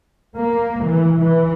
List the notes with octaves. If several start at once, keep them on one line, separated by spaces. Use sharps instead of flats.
A#3
E3
E3